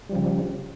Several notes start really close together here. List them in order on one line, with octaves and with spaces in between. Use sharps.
G3 F3 C#3